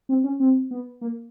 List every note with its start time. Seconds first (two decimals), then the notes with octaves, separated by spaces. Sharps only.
0.09 C4
0.24 C#4
0.40 C4
0.71 B3
1.01 A#3